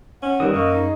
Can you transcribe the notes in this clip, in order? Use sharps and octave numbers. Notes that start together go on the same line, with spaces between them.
C#4 F#5
D#3 G3 E4 F#4 B4 D#6
F#2 A#3 D#5 C#6
D#4 G#4